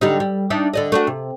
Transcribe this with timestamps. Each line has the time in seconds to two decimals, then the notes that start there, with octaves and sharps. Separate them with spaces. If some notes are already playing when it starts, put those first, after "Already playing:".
0.01 D3 G3 D#4
0.20 G3
0.50 D4 D#4 E5
0.74 D3 D5 D#5
0.92 A3 D4 F#4
1.07 C3